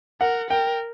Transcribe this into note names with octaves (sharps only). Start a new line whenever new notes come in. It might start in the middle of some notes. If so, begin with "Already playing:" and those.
A#4 F#5
A#4 G5